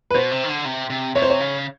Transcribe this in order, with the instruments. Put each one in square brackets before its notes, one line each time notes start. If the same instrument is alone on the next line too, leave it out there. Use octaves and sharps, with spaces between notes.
[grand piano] B4
[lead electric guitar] B2 [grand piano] C5
[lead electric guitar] C3
D#3
D3
C3
C3
[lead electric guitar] C3 [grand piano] C#5
[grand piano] C5
C#5
[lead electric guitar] C#3